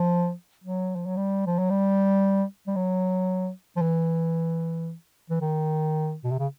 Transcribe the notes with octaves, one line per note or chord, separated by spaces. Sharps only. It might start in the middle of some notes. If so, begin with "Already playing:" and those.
Already playing: F3
F#3
F3
F#3
G3
F3
F#3
G3
G3
F#3
F3
E3
E3
D#3
B2
C3
C#3